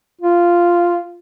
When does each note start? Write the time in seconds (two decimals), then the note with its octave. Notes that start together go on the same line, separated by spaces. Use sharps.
0.21 F4